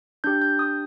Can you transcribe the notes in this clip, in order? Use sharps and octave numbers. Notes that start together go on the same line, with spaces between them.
D4 G4 G6
G6
D#6